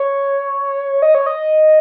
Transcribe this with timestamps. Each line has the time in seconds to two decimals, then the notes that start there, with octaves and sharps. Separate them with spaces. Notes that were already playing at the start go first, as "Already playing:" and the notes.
Already playing: C#5
1.02 D#5
1.15 C#5
1.26 D#5